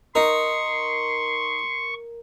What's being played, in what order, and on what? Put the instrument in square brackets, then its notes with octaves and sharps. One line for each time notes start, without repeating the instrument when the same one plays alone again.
[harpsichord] D#4 [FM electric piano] A#4 [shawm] C6 [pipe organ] C#6